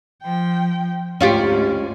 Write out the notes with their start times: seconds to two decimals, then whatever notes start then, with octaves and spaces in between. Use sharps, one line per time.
0.22 F3 G5
1.21 D2 G#2 C#4 F4 G4